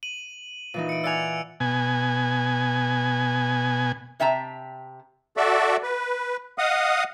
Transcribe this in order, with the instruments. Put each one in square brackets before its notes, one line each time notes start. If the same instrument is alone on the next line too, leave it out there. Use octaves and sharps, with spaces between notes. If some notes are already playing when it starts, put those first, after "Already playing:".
[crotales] D#7 F#7
[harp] A#2 E3 D#4
[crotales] C#7 D7
[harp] D5 F#5 G#5 [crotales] E6 C#7 F7
[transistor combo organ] B2 G#5
[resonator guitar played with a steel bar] C3 E5 G5 A5 A#5
[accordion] F#4 A4 D5 E5
B4
D#5 F5 F#5 D#6